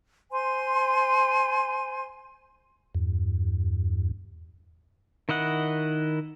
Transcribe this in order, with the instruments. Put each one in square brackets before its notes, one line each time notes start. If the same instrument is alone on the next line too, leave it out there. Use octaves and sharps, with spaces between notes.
[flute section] C5 G#5 C6
[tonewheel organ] E2 G2
[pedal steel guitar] D#3 E4 D#5 F#5